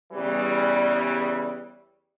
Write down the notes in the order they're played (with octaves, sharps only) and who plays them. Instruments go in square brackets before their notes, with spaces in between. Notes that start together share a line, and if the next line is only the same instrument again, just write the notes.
[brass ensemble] E2 C#3 E3 G3